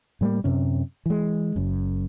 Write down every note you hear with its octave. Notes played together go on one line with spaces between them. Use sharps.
A2 G3 G#3 A#3
F#2 C3 C#4
E3 G#3
F#1 F#2